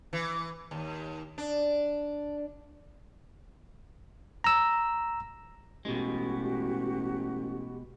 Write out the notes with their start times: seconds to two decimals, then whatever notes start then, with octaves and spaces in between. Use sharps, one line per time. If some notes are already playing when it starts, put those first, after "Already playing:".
0.13 E3
0.71 D#2
1.38 D4
4.44 A#5 E6
5.85 A1 B2 G#3 F#4 G4